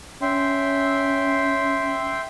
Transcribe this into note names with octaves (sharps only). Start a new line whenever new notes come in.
C#4 E5 G5 C6